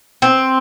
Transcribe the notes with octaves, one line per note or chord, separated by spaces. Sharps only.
C4